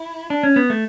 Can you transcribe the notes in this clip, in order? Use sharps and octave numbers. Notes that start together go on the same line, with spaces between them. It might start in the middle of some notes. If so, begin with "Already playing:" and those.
Already playing: E4
D4
C#4
B3
A3